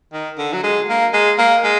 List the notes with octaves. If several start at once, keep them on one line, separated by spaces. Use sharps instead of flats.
D#3
D3
F#3
G#3
A#3
G#3
A#3
G#3